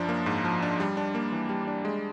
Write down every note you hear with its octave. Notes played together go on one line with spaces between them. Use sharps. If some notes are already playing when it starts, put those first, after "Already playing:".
Already playing: F#2 F3 D4
A#3
G#2
F3
D4
G3
D4
A#3
E3
G3
D4
G#3